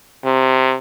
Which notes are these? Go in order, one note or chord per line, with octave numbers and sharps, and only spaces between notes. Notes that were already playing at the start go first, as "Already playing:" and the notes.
C3